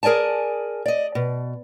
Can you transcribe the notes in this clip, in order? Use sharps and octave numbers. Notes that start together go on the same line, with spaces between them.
G#4 A#4 D5 G#5 A5
D5 D#5
B2